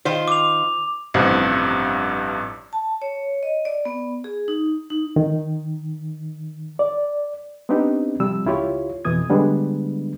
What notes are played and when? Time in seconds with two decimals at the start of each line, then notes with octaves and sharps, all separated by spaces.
0.05 D#3 F4 C5
0.28 D6 F7
1.14 A1 G2 C3 F3
2.73 A5
3.02 C#5
3.43 D#5
3.65 D5
3.85 B3
4.24 G#4
4.48 D#4
4.90 D#4
5.16 D#3
6.79 D5
7.69 B3 C4 D4 D#4 G4
8.20 C3 F3 G3 E6
8.46 C#2 E4 F4 G4 C#5
9.05 F2 B2 E3 D#6 G#6
9.30 D3 G3 G#3 B3 D4